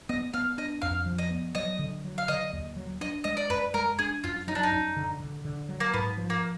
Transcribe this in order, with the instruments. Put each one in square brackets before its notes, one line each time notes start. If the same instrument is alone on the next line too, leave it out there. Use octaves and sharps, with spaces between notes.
[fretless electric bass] B3 [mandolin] D#5
[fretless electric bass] B3 [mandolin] F5
[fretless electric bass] D4 [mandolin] D#5
[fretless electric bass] F2 [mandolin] F5
[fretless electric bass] F3
[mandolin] D#5
[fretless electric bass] B3
[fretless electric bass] F#3 [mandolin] D#5
[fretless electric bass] D3
F#3
[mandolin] F5
[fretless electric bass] D3 [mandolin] D#5
[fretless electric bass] D#2
F#3
[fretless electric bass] D4 [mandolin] D#5
[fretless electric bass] G#3 [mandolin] D#5
[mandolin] D5
[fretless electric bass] F#2 [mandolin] B4
[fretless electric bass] G#3 [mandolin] A#4
[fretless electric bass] D4 [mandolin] G#4
[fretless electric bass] F#2 [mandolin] F4
[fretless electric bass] F#3 [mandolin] D#4
[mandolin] D4
D#4
[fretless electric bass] F#2
D3
D3
D3
F#3
[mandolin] A#3
[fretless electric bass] G#2 [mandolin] B3
[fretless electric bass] F3
[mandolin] A#3